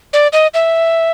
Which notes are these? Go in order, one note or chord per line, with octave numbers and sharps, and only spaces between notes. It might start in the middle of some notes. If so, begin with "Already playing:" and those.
D5
D#5
E5